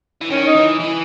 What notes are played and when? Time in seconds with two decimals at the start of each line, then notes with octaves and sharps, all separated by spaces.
0.21 E3
0.31 D#3 C#4
0.47 D#4
0.55 E3
0.80 E3